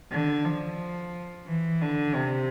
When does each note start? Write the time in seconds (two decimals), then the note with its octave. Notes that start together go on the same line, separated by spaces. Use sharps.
0.12 D3
0.45 F3
1.46 E3
1.82 D3
2.14 C3